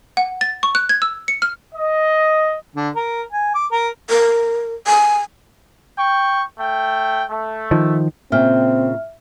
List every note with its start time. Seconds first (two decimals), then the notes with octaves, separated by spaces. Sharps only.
0.17 F#5
0.41 A6
0.63 C#6
0.75 F#6
0.89 G#6
1.02 E6
1.28 C#7
1.42 F6
1.75 D#5
2.76 D3
2.95 A#4
3.32 G#5
3.54 D6
3.71 A#4
4.09 A#4
4.87 G#5
5.98 G5 C#6
6.59 A3 G5
7.30 A3
7.71 D#3 F3
8.32 A#2 C#3 C4 E5 G5 F6